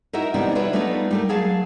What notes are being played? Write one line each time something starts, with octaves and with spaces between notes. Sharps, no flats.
D#4 E4 F#4 A#4 D#5 E5
C3 E3 G3 B3 D4 D#4
D4 F4 F#4 B4 C#5 E5
G3 A3 B3 D4 D#4 F4
G3 A3 A#4
F#3 G#4 F5 A5